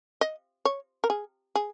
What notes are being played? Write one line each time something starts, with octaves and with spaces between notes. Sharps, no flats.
D#5
C#5
A#4
G#4
G#4